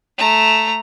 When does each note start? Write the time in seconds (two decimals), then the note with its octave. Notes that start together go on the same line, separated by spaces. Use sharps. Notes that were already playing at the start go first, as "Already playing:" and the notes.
0.18 A3 A#5